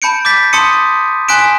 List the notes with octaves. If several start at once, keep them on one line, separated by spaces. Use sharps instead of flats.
A5 B5 G6 C#7 D7
D6 G6 A6 B6
A5 C6 D#6 C#7 D#7
G#5 C6 F#6 B6 D7 E7